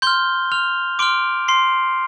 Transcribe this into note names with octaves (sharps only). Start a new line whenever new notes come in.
C6 F6 G6 G7
F6 F7
C6 D6 F6 D7
C6 C7